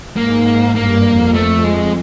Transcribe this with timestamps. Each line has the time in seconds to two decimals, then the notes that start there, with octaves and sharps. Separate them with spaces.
0.16 G#2 A#3
0.75 G2 A#3
1.05 F2
1.34 A3
1.64 G#3